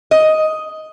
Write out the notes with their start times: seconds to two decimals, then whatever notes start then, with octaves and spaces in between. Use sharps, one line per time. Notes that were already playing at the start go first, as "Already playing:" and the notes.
0.11 D#5